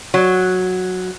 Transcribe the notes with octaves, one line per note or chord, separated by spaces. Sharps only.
F#3